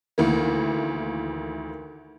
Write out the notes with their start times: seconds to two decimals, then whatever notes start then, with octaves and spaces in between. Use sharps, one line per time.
0.18 D2 D#3 E3 A#3